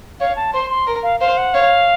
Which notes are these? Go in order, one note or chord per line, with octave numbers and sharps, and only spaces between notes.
C#5 F5
A5
C5 C6
C6
A#4
F5
C5 F5
F#5
C#5 F5